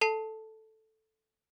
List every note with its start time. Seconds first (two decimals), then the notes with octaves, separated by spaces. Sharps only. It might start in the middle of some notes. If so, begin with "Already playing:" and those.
0.01 A4 A5 C7